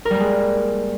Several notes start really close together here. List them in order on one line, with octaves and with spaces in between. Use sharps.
A#4 G3 A#3 G#3